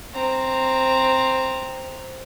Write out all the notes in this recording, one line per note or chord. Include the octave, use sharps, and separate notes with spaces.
C4 A#5